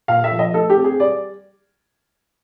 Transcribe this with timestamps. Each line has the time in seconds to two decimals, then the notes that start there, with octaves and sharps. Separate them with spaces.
0.08 A#2 F5
0.24 E5
0.32 F3
0.39 D#5
0.54 A3 A4
0.70 G4
0.77 C4
0.84 G#4
1.00 G3 D5